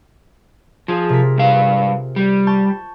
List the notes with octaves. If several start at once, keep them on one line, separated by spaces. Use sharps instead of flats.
F3 F4 G#4
C3 A#4 B6
G2 F5
G3
A5 C#6 G6